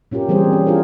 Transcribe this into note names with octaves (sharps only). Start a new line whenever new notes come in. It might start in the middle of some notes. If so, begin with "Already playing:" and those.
A#2 C#4 F4 G4 A#4
E3 G3 C4 G#4 C5
C#4
D4 F4 F#4 G#4 A#4